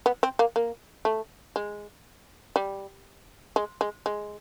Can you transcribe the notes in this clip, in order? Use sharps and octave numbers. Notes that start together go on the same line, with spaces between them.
B3
C4
A#3
A#3
A3
G#3
G3
G#3
G#3
G#3